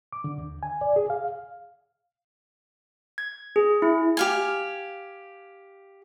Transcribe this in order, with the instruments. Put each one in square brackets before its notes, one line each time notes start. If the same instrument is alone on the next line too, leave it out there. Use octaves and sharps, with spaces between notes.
[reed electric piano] D6
D3
D#2
G#5
D5
G#4
F5
[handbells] G#6
G#4
E4
[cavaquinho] G4 F5 G#5